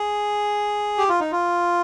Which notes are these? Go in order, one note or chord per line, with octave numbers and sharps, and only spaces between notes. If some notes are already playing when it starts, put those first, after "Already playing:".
Already playing: G#4
G4
F4
D#4
F4